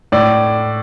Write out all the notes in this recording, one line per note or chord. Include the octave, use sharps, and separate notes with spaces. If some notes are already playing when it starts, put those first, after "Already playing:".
A2 D5